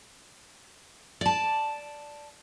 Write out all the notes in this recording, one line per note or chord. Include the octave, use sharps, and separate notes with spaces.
D5 A5